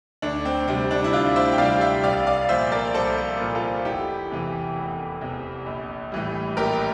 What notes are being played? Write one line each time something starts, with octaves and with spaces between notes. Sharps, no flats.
D2 D4
C4
C3 G3 C4
D4
E4
D2 D4 F4
C5 E5
G5
C3 G3 D5 F5
E5 G5
C2 D5 F5
D5 F5
A#2 F3 C5 E5
A#4 D5
C2 A4 C5
A#2 F3
F4 A4
F1 E4 G4
E2 C3 E3
F1
E2 C3 E3
A#1
A2 E3 G3
A#1 G4 A#4